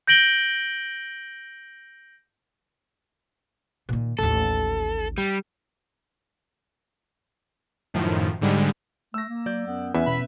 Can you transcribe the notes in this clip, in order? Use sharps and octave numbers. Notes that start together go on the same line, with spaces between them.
G6 A#6 D7 F#7 G7
A#2 D#3
A1 D#2 A4
G3
F#2 A2 D#3 F3
G#2 D3 G3 G#3
A3 E6 A#6
A#3
F#3 D5 G6
F#2 B3
E2 C#4 B4 E5
B2 B3 C#4 B5